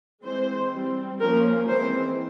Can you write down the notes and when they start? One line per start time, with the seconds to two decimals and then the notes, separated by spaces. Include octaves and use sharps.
0.24 E3 G#3 C4 C5
0.72 G3 C4
1.20 F3 A#3 C#4 A#4
1.68 E3 G#3 C4 C5